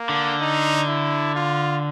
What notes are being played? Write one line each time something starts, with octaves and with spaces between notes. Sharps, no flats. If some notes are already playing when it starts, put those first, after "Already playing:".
Already playing: A#3
D3
D#4
E4
F4